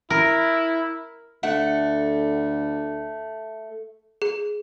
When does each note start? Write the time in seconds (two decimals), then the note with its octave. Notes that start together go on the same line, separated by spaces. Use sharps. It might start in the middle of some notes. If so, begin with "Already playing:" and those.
0.10 E4 A#4
1.43 D2 A3 F#5
4.22 G#4